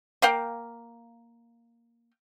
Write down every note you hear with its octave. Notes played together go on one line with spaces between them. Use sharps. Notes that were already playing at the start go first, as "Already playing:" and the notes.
A#3 F5 G5